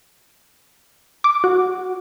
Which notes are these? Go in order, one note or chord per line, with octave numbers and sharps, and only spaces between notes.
D6
F#4